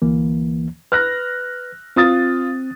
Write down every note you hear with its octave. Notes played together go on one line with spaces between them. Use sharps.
D2 E3 A#3
B4 F6 F#6 A#6
C4 F4 D#6 A6